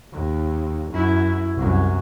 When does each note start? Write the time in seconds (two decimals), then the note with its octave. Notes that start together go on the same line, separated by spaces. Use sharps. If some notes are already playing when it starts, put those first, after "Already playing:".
0.13 D#2
0.91 F#2 E4
1.55 C2 F#2